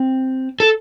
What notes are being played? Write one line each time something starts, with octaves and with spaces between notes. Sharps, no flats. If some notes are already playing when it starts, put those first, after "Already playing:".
Already playing: C4
A4